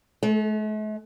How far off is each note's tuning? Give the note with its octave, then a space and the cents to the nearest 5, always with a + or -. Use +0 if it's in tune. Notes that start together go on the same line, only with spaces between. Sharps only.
A3 -45